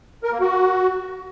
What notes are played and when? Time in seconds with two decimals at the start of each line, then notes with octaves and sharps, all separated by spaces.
0.23 A#4
0.32 A#3
0.40 F#4